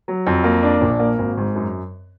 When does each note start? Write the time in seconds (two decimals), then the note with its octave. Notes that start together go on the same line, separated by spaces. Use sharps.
0.08 F#3
0.27 F2
0.44 A#3
0.63 D4
0.81 A#1
1.00 A#3
1.18 G#1
1.37 G#2
1.55 F#2